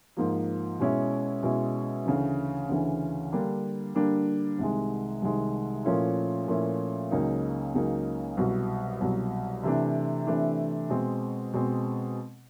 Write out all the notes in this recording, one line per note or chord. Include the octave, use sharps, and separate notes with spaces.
G#2 F3 A#3
B2 G#3 C#4 E4
B2 G#3 C#4 E4
D2 C#3 E3
D2 C#3 E3
D3 G3 A#3 D4
D3 G3 A#3 D4
C2 C3 D#3 G#3
C2 C3 D#3 G#3
A#2 F3 A3 C#4 E4
A#2 F3 A3 C#4 E4
C#2 C#3 F#3 A#3 D#4
C#2 C#3 F#3 A#3 D#4
C2 B2 F#3
C2 B2 F#3
C3 E3 A3 D4
C3 E3 A3 D4
B2 G#3 C4
B2 G#3 C4